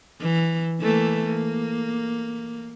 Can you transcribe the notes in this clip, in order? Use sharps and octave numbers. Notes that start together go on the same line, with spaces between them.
E3
E3 A3 A#3
A#3